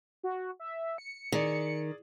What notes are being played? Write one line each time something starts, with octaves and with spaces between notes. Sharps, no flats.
F#4
E5
C#7
D#3 G#4 D5